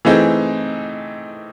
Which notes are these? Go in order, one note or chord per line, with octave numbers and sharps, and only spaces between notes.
E3 A3 C4 D#4 G#4